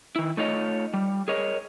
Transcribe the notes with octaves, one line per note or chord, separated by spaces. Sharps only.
D#3 E4
A3 D#4 F4 C#5 D#5
G3
G#4 A#4 C#5 D#5